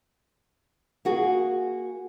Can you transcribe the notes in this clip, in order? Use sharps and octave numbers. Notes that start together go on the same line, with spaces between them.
A#3 F#4 G#4